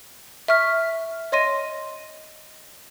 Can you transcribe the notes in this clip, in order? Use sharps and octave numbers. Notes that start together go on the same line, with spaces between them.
E5 C#6 F6 B6
C#5 D#5 C6 A#6 D#7